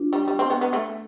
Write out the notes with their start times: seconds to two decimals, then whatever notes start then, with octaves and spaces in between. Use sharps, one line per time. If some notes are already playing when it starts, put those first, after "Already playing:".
Already playing: D4 F4
0.13 G3
0.28 G3
0.39 C4
0.50 B3
0.61 B3
0.73 A3